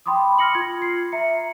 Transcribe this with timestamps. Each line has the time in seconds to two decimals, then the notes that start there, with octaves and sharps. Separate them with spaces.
0.06 G5 B5 C6 D6 D#6
0.38 C6 F6 A#6 C#7 F#7
0.55 F4 G#6
0.82 C7
1.12 E5 A#5 C#7